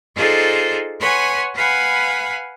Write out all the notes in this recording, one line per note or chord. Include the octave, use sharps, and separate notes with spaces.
D#4 F4 G#4 A4 C5 D5
B4 C#5 F#5 G#5 C6
B4 F5 F#5 G#5 B5